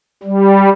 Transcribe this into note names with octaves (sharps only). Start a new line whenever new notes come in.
G3